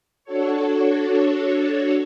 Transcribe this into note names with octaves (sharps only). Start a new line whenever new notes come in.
D4 F#4 A4 C#5